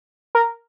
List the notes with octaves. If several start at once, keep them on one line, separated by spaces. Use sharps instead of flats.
A#4